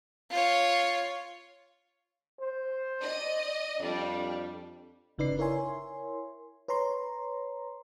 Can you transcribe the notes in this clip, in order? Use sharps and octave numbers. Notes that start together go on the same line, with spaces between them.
F4 C#5
C5
D5 D#5
F2 G3 D4
G1 C#3 D#4 B4 D5 C7
E4 A#4 C#5 E5 G#5 C6
B4 C#5 A#5 C6